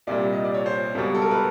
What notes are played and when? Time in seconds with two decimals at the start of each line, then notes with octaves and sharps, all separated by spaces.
0.07 C2 A#2 G3 D5
0.33 D#5
0.44 D5
0.54 C#5
0.66 C5
0.95 C#2 B2 G3
1.14 A4
1.22 A#4
1.31 B4